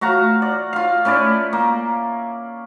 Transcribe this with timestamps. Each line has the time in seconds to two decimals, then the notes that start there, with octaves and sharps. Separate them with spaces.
0.01 A3 F#4 F5 A#5
0.42 D5
0.73 F4 F5
1.05 A3 C#4 E4 D5
1.53 A#3